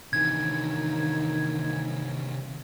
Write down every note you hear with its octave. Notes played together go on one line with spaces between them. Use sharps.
C3 D#3 E3 D#4 G#6